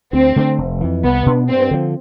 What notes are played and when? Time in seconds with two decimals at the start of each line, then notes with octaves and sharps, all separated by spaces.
0.13 D2 C4
0.36 D3 A3 D4
0.58 F1
0.81 F2 E3
1.03 C2 B3
1.26 B2 B3 D4
1.49 G2 C4
1.71 D3 F3